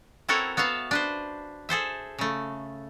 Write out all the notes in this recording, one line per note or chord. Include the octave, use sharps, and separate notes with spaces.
C4 E4 F#4 A4 A#4 C#5
B3 F#4 E5 F5 A5
D4 B4 C5
G#4 A4 C5 E5
C#3 A3